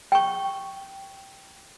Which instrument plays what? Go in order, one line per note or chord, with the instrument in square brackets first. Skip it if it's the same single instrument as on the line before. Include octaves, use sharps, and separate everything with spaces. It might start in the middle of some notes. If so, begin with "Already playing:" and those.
[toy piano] G5 C#6